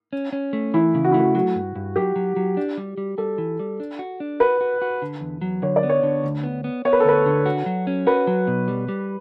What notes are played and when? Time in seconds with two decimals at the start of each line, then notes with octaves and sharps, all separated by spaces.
0.13 C#4
0.33 C#4
0.53 A3
0.74 E3 E4
0.95 C#3
1.05 F#4
1.12 E4
1.14 A3
1.19 F#4
1.35 F#3 F#4
1.55 G2
1.76 G2
1.96 F#3 G4
2.16 F#3
2.36 F#3
2.57 D4
2.78 G3
2.98 G3
3.18 G3 A4
3.38 E3
3.59 G3
3.80 D4
3.99 F#4
4.20 D4
4.40 F#4 B4
4.61 F#4
4.82 F#4
5.02 D3
5.21 E2
5.41 F#3
5.62 D3 C#5
5.76 D5
5.83 B3
5.89 C#5
6.03 D3
6.24 D2
6.44 B3
6.64 B3
6.85 B3 C#5
6.93 B4
7.00 A4
7.05 D2 B4
7.26 D3
7.46 F#4
7.66 F#3
7.87 C#4
8.07 F#4 B4
8.27 F#3
8.47 B2
8.68 G3
8.88 G3